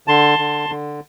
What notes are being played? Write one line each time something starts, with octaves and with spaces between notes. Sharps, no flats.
D3 A5 C6
D3
D3